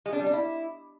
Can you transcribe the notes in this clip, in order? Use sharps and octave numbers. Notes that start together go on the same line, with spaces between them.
G#3
D4
G3
D4
E4